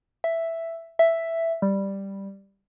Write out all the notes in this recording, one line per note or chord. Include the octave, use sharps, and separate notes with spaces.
E5
E5
G3